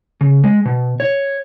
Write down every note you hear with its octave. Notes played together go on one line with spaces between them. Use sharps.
C#3
G#3
B2
C#5